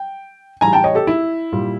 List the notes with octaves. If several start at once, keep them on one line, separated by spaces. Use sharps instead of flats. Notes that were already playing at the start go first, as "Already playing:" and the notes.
Already playing: G5
A2 E3 G3 G#5 A#5
G5 A5
C#5 D#5
G4 A4
E4
A#2 G3